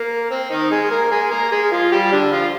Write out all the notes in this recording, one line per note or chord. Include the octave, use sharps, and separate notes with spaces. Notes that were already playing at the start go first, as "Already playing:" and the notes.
Already playing: A#3
C4
D#3 D#4
G#3 G#4
A#3 A#4
G#3 G#4
A#3 A#4
G#3 G#4
F3 F4
G3 G4
D3 D4
F3 F4